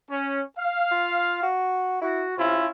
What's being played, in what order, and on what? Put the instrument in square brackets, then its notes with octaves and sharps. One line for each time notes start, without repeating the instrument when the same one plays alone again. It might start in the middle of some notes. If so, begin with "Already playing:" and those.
[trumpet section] C#4
F5
[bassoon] F4
F#4
[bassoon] E4 [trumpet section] F#4
[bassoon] C3 [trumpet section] C#4 E4 F4